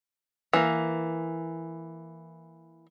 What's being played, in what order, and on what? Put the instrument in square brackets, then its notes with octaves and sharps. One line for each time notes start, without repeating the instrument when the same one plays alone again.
[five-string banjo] E3 A#3